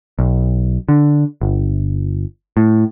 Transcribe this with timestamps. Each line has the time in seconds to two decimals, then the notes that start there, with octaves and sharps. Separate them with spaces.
0.19 B1
0.88 D3
1.41 G1
2.57 A2